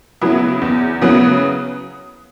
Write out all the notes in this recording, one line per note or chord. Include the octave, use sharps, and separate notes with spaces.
C#3 F#3 B3 E4
E2
C#3 F#3 B3 E4